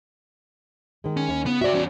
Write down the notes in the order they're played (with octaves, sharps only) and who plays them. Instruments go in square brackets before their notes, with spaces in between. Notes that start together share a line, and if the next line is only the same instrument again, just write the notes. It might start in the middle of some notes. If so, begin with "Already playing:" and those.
[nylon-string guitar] D#3 G#3
[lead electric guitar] C#4
[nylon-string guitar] D#2
[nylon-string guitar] C#3 [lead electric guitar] B3
[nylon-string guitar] F#4 D5 [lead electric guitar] C5 E5
[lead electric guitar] E2 C#4